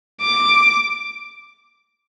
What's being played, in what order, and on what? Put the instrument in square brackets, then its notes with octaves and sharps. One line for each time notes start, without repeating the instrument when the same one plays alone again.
[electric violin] D6